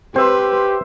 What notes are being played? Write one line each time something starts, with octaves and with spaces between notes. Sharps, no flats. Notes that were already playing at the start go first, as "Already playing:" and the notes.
C4 G4 B4 C5 E5 C6